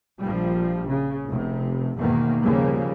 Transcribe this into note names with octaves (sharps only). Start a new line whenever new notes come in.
A#1 F3 G3
C#3
F1 C3
E2 G#2 B2 D#3 A#3
D#2 C#3 F3 G3 A#3